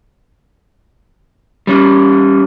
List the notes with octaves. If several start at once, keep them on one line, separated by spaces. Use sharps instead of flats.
G3 C#4